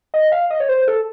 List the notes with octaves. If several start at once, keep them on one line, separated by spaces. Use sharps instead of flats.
D#5
F5
D#5
C#5
C5
A4